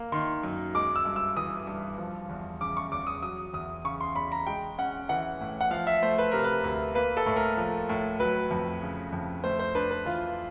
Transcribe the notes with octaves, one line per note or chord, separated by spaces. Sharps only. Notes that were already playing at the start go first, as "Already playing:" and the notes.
Already playing: A#3
D#3 C6
F#2
G#3 D6
E6
G2
E6
E3 D#6
G2
F3
E2
C#3 D6
C#6
E2 D6
D#6
F#3 D#6
E2 D#6
C#3 C#6
C6
E2 B5
A#5
G#3 G5
C#4 F#5
E3 F#5
A2
F#5
F3 F5
E5
A3 C5
B4
C3 A#4
B4
D2
A#3 B4
A4
A2
A#4
F3
A2
F#3 B4
F2
C#3
F2
A3 C5
C5
D4 B4
B4
E3 F4